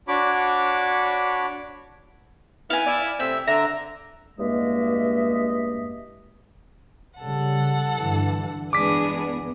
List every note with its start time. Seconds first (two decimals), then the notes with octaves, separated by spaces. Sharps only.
0.08 D4 F#4 C#5 B5 D6
2.70 B3 E4 F5 G#5
2.87 E4 D5
3.20 C3 A3 C4 E5
3.47 D3 E5 A#5
4.39 E2 G2 G#3 A#3 D#5 E5
7.19 C#3 G3 A4 F#5
7.97 G2 D3 E3
8.73 E3 G#3 B3 D4 G#4 D6 B6